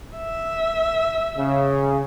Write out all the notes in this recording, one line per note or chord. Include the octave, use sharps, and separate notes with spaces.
E5
C#3